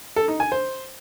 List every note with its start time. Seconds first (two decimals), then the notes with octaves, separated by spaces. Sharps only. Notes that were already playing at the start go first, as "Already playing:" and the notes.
0.16 A4
0.28 D#4
0.40 G#5
0.52 C5